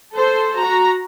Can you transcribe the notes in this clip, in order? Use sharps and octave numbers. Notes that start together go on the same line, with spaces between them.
A4 C5
F#4 A#5